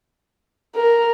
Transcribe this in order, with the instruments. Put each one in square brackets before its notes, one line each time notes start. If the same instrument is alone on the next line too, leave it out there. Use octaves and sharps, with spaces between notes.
[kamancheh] A#4